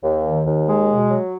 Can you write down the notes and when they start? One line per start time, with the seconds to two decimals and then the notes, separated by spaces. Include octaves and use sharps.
0.03 D#2
0.24 D#3
0.45 D#2
0.67 G#3
0.89 B2
1.10 F#3